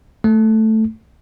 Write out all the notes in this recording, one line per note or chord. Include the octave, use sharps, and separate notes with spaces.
A3